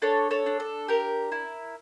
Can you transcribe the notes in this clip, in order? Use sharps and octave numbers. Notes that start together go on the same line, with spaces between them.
D4 A4 C#5
A4 C#5
D4
A4
G4 A#4
E4